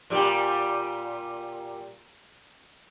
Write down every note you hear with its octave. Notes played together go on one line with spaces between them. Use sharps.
A#2 G3 G4